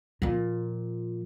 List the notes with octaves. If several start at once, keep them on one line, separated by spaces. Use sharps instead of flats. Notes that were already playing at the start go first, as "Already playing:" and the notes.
A#2 F3